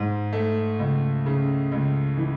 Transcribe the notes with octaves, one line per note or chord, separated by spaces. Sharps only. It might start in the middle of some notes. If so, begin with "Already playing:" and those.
Already playing: G#2
A3
C#2
C#3
C#2
E3